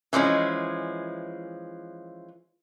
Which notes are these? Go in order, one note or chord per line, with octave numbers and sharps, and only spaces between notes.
E3 F3 G#3 C#4